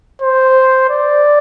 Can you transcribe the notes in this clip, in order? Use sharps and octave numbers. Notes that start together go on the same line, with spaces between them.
C5
D5